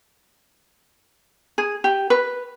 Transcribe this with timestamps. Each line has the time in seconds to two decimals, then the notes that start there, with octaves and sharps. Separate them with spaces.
1.58 G#4
1.84 G4
2.10 B4